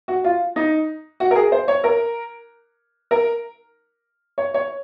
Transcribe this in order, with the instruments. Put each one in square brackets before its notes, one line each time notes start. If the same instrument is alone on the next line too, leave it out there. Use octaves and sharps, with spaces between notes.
[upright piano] F#4
F4
D#4
F#4
A#4
G#4
C5
C#5
A#4
A#4
C#5
C#5